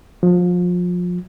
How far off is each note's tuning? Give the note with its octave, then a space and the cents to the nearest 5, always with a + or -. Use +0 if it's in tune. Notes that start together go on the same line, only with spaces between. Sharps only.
F3 +30